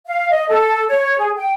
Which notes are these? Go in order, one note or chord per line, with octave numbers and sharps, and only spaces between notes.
F5
D#5
A4
C#5
G#4
G5